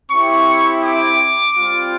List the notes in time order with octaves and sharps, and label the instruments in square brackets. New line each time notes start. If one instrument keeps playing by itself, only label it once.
[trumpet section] C4 E4 G4 C#6
D6
G3 C4 F4